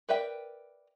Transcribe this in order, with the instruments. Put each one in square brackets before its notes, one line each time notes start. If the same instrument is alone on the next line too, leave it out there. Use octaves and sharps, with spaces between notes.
[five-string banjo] A#4 B4 D5 E5 G5